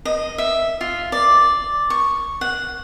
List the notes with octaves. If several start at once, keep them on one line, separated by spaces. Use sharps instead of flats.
D#5
E5
F4
D5
C#6
F#5